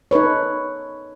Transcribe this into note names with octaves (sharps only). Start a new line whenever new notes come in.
D#4 A4 B4 C#5